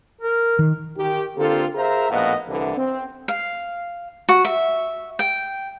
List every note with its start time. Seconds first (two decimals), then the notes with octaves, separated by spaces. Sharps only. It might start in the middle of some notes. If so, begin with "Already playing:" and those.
0.21 A#4
0.59 D#3
0.96 D#3 G4
1.37 D3 A#3 C4 F4 G4 A4
1.75 G#4 A#4 C5 E5 F5 A#5
2.10 A#1 A2 B3 D#5 F5 F#5
2.48 C2 D3 E3
2.77 C4
3.28 F5
4.29 F#4
4.45 E5
5.19 G5